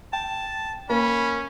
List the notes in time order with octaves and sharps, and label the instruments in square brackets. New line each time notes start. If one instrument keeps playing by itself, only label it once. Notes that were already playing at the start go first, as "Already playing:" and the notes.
[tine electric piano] G5 [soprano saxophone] A5
[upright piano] A#3 [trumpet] C#4 [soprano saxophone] B5